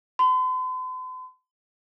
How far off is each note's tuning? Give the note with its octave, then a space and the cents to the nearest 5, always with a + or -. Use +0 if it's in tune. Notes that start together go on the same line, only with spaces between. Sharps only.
C6 -45